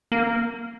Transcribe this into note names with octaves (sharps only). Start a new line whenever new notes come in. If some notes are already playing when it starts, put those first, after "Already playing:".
A#3